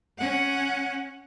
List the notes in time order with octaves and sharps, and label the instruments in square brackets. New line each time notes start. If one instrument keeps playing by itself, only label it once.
[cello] C#4 F#5